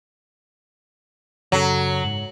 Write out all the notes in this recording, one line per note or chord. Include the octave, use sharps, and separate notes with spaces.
F#2 C#3 F#3 A4
G#2